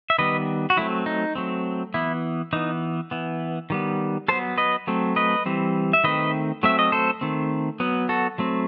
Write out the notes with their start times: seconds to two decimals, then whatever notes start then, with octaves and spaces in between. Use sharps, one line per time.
0.10 E5
0.19 D#3 G3 B3 B4 D#5
0.70 F#4
0.77 F#3 A3 C4 E4
1.06 D#4
1.35 F#3 A3 C4
1.94 E3 B3 E4
2.53 E3 B3 D#4
3.11 E3 B3
3.70 D#3 G3 B3
4.28 F#3 B3 A4 C5
4.58 B4 D#5
4.87 F#3 A3 C4
5.16 B4 D#5
5.46 E3 G3 C4
5.93 E5
6.04 D#3 A3 C4 B4 D#5
6.63 F#3 A3 C4 E5
6.79 D#5
6.92 A4 C5
7.21 D#3 A3 C4
7.80 F#3 B3
8.09 F#4 A4
8.38 F#3 A3 C4